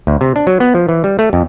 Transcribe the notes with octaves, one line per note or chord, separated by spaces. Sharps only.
D2
C3
D4
F#3
B3
F3
E3
G3
A3
F2